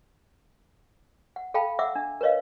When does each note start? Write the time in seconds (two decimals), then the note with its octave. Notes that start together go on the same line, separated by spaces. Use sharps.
1.36 F#5
1.54 A4 F5 G5 A5 B5
1.79 E5 F#5 D6 E6
1.95 D4
2.21 A#4 B4 C#5 D#5 F5